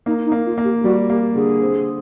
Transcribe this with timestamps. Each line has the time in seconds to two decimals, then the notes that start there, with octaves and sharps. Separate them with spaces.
0.06 A#3 D#4
0.26 D#4
0.32 A#3
0.46 F4
0.58 A#3
0.64 G4
0.84 G3 F#4
1.10 A#3 G4
1.35 D3 G#4
1.62 C4